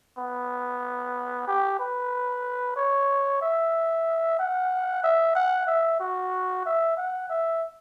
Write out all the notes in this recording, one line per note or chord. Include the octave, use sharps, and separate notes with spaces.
B3
G4
B4
C#5
E5
F#5
E5
F#5
E5
F#4
E5
F#5
E5